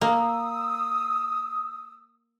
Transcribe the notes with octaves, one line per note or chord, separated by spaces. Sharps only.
A#3 D#6 E6